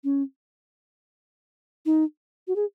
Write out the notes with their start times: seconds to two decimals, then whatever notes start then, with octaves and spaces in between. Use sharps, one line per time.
0.04 C#4
1.86 D#4
2.47 F#4
2.56 G#4